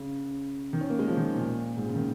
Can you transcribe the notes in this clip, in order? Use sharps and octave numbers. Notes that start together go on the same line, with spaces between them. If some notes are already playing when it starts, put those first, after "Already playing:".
Already playing: C#3
D#3
C#4
A#3
G#3
F3
D#3
A#2
G#2
C#3
D#3